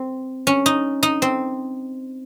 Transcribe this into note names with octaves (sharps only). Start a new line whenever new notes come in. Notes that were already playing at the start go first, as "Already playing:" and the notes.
Already playing: C4
C#4
D#4
D#4
C4